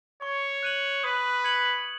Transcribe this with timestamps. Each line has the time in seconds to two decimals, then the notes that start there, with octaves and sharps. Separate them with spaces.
0.22 C#5 C#6
0.63 F#6 D#7 F#7
1.03 B4 D#6
1.44 G#6 C#7 F#7